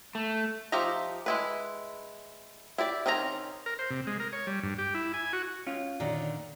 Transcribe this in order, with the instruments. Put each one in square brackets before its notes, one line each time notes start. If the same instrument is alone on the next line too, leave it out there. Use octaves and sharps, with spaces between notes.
[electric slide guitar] A3
[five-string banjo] F3 D#4 G4 E5 A#5
G#3 E4 B4
E4 G4 D5
D#3 C4 C#4 D#4 A#5
[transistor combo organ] A#4
C5
C3
G#3
A#4
C#5
G3
G2
G4
E4
G#5
F#4
[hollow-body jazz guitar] C#4 F4
[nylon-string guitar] A#2 D3 D#3